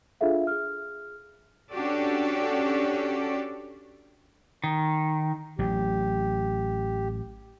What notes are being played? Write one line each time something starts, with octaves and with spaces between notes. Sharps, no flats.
D4 F4 G#4 A4 E5 F5
G#4 F6
C#4 D4 F#4 G4 A4 D5
D#3
A1 F#3 G4